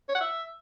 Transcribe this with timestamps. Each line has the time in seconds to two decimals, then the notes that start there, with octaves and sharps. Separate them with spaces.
0.09 C#5
0.15 F#5
0.21 E5